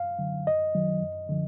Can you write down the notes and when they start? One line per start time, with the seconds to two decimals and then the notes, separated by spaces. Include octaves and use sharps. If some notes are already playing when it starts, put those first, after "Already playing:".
Already playing: F#2 F5
0.19 D3 F#3
0.47 F#2 D#5
0.75 D#3 F#3
1.01 F#2
1.29 D3 F3